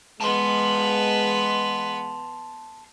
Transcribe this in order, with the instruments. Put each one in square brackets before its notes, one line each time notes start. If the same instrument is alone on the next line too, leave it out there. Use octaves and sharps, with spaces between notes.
[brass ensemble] G#3 [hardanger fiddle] B3 B4 [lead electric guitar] A5 C6